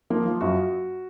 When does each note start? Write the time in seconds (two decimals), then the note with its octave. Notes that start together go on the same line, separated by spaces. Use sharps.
0.10 F3 A#3
0.26 F3 F4
0.41 F#2 F#4